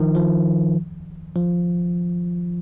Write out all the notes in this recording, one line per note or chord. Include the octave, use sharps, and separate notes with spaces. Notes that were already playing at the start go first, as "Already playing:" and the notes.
Already playing: D#3 F3
F3
F3